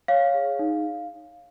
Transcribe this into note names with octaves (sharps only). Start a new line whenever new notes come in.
C#5 F5
G#4
D#4